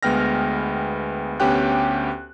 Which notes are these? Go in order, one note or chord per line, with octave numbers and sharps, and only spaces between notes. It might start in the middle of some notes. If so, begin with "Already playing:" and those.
D2 G#3 B3 G5 F6 A#6
D2 B3 C#4 G4 G5 F#6